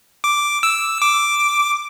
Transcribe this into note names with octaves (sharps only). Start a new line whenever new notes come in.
D6
E6
D6